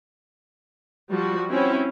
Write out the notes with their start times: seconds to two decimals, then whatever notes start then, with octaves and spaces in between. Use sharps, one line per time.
1.09 F3 G3 F#4
1.49 C4 C#4 E4 F#4